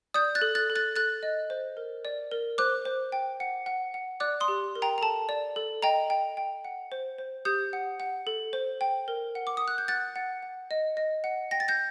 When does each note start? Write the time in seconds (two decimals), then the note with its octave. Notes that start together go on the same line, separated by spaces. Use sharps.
0.14 D5 D#6 G6
0.35 F#6 A6
0.42 A4
0.55 F#6 A6
0.70 A4
0.75 F#6 A6
0.96 A4 F#6 A6
1.23 D#5
1.50 C5
1.77 A#4
2.05 D5
2.31 A#4
2.58 C5 D6 F#6
2.85 C5
3.12 G5
3.40 F#5
3.66 F#5
3.94 F#5
4.20 D5 D6 F#6
4.40 C6 D#6
4.48 G4
4.75 A#4
4.82 G5 A#5
4.98 A#5
5.01 A4 A5
5.29 D5
5.56 A4
5.82 D#5 G5 A#5
6.10 G5
6.37 G5
6.65 F#5
6.92 C5
7.18 C5
7.45 G4 D#6 G6
7.73 F#5
8.00 F#5
8.27 A4
8.53 C5
8.81 G5
9.08 A#4
9.35 F#5
9.47 D6
9.57 F#5 D#6
9.68 F#6
9.78 G6
9.88 F#5 F#6 A6
10.16 F#5
10.43 F#5
10.71 D#5
10.97 D#5
11.24 F#5
11.51 G5 A#6
11.60 A6
11.68 G6 A#6